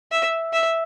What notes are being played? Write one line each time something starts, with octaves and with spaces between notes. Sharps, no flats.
E5
E5